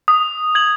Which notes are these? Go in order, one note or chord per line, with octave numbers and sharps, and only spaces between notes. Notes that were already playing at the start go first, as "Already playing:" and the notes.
D#6
G#6 F#7